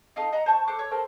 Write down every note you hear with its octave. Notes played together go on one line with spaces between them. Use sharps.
D#4 F4 A4 D#5
D#5 F#5 A#5
C5 A5 B5 C#6
A4 C5 D6 F#6
C#5
A4 A#4 C5